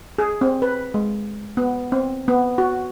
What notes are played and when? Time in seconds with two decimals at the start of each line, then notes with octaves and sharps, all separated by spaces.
0.18 G#4
0.41 C4
0.62 B4
0.94 G#3
1.57 B3
1.92 C4
2.28 B3
2.58 F#4